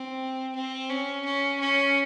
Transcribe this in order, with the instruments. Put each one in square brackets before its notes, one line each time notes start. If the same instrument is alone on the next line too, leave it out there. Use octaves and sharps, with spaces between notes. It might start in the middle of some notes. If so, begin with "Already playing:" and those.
Already playing: [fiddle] C4
C4
C#4
C#4
C#4